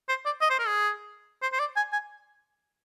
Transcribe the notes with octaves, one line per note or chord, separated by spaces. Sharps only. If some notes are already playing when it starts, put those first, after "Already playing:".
C5
D5
D#5
C5
A#4
G#4
C5
C5
D5
G#5
G#5